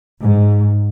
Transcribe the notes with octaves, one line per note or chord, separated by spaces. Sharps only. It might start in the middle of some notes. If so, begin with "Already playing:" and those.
G#2